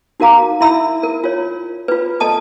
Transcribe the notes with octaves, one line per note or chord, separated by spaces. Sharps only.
D#4 F#4 A#4 F5 A#5 D6
E4 E5 B5 E6
A#4
F4 C#5
F4 B4
A4 D#5 A5 D#6